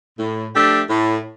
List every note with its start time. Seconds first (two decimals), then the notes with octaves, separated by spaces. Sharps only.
0.19 A2
0.54 F3 A3 D4 G4
0.89 A2